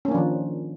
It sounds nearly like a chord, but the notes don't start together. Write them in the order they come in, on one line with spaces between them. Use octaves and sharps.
C#4 A#3 D4 F3 D#3